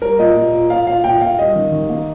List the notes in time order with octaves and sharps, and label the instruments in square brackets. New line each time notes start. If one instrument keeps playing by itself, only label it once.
[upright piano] G3 [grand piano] A#4
[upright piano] A#2 [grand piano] D#5
[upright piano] A#2
A#2
[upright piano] A#2 [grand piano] F5
[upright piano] A#2 [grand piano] F5
[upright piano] A#2 [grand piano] G5
[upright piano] A#2 [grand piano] F5
[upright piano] G3 [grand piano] D#5
[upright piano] D#3
D#3
A#3